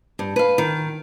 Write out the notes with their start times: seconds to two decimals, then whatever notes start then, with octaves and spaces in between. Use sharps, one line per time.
0.19 G2
0.36 B4 F5
0.58 D#3